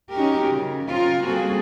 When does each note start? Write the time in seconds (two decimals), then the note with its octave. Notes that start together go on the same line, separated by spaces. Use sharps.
0.11 C#4 D#4 F#4 G4 A#4
0.51 C#3
0.88 C#3 C4 F4 A#4
1.23 G3 A#3 C4 F#4 G#4 A4